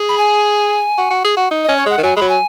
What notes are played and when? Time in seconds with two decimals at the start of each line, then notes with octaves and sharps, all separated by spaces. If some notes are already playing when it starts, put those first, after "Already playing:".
Already playing: G#4
0.09 B5
0.18 G#5
0.98 F#4
1.11 F#4
1.24 G#4
1.37 F#4
1.51 D#4
1.64 D#5
1.69 C#4
1.77 C#5
1.86 G#3 F#5
1.98 D#3
2.03 F#3 G#5
2.16 G#3 B5
2.21 F#3
2.29 G#5